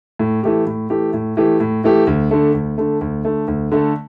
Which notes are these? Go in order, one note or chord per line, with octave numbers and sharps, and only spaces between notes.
A2
E3 A3 G4
A2
E3 A3 G4
A2
E3 A3 G4
A2
E3 A3 G4
D2
D3 A3
D2
D3 A3
D2
D3 A3
D2
D3 A3